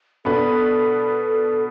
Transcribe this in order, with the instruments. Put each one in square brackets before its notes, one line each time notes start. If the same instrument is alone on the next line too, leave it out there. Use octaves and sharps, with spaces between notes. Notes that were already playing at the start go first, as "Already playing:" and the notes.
[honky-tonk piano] B2 B3 D4 B4 [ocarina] A4